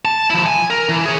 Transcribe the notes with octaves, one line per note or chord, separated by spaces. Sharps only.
A5
F3 E4
G#5
A#4
E3
G#4 C#5